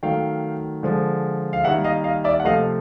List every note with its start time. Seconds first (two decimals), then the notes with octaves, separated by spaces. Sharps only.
0.03 D#3 F#3 A3 F5 G5
0.83 D3 F3 G#3
1.53 F5
1.64 D#3 G3 A#3 E5 F#5
1.84 D#5 F5
2.04 D#5 F5
2.24 D5 E5
2.40 F#5
2.44 C3 F3 A3 D#5 F5